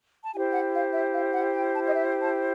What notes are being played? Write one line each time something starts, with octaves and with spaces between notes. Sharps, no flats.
A5
E4 G4 C5 G#5
F#5
F5
E5
F5
F#5
G5
A5
D#5
E5
A5